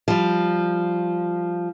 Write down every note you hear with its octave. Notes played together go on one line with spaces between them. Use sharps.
F3 G3